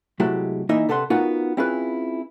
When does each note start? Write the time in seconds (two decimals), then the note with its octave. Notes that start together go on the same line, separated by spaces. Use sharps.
0.20 C3 F#3 G#3 A3 E4 G4
0.69 E3 A#3 D#4 E4 D#5 E5
0.89 C3 A4 B4 F#5 B5 C6
1.10 B3 C#4 D#4 F4 F#4 A#4
1.57 C4 C#4 E4 F4 G#4 B4